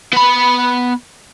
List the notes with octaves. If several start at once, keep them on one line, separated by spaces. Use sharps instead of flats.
B3 B5